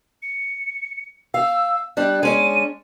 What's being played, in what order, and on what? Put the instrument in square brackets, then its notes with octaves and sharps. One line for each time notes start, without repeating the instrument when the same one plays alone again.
[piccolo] C#7
[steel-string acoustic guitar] F5 [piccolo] E6
[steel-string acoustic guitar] G3 D4 [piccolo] F#6
[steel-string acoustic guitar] G#3 C#4 D4 [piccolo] D#7